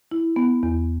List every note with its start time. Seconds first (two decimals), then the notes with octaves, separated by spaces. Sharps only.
0.11 E4
0.36 B3
0.63 E2